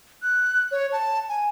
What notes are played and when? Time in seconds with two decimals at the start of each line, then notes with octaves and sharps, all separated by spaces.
0.22 F#6
0.71 C#5
0.92 A5
1.29 G#5